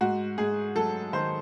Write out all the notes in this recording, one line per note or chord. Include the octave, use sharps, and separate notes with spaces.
G#2 F#4
G#2 G#4
F#3 A4
D#3 C5